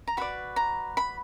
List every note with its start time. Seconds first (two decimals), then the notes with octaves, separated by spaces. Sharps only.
0.08 A#5
0.17 F#4 B4 D5 B5
0.56 A#5
0.97 B5